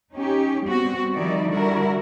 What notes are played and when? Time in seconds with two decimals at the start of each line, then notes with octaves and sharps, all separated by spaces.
0.14 C#4 D#4 G4
0.64 G3 B3 C4 F#4
1.13 D#3 F3 G3 D#4 E4 D5
1.49 D3 G3 E4 F#4 A#4